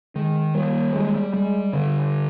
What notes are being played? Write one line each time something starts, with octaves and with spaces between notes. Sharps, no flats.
D#3 G#3
G3 A#3
G3 G#3
G3 G#3
D3